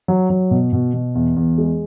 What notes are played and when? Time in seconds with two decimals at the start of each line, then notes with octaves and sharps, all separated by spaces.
0.08 F#3
0.30 F#3
0.51 B2
0.73 B2
0.94 B2
1.15 E2
1.36 E2
1.58 G#3